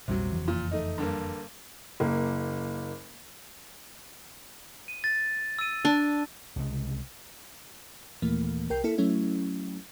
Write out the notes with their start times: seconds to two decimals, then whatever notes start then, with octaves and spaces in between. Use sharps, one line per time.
0.08 A#1 E2 C3 F#3 G3
0.32 F#1 F2 E3
0.48 A#2
0.71 A3 D#4
0.98 G2 D3 A#3
2.00 F#1 A#3
4.88 D#7
5.04 A6
5.59 E6 D#7
5.85 D4
6.56 C2 C#3 E3 G#3
8.22 D#2 A#2 E3 A3 A#3
8.70 C2 A#4 G5 G6 C7
8.84 A#3 E4 A4 C#7
8.98 F#3 A3 C#4 E4